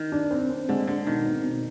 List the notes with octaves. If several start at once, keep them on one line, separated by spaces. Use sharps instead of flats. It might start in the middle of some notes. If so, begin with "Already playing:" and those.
Already playing: D#3
D4
C4
C4
D3 G#3
D3 G#3
B2 D#3
C4
B2